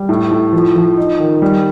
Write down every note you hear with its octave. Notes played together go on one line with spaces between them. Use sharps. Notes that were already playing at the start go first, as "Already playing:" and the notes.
Already playing: G3
A2
A2
F3
F3
D#4
D#3
G3